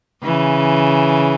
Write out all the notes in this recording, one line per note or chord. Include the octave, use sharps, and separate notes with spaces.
C#3 E3